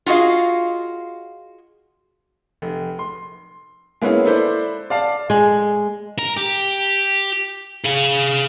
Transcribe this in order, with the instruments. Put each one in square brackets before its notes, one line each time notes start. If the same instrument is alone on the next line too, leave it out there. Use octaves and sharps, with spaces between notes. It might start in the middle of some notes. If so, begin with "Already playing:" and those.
[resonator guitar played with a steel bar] F4 F#4 G#4 D#5 F5
[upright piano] F1
C6
G#3 A#3 B3 C#4 E4
E4 A4 B4 C5 D5
D5 F5 A5
[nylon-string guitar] G#3
[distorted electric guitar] A#4
G4
G#4 F5